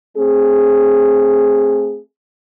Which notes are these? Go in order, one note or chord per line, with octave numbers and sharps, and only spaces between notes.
A3 C4 G#4